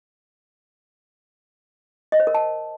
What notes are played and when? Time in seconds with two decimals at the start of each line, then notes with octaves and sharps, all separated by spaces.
2.12 D#5
2.20 C5
2.27 A#4
2.34 A5